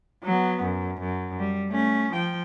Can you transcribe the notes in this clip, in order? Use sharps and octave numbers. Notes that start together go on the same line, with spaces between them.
F#3 B3
F#2
F#2
G3
A3 C#4
F3 G5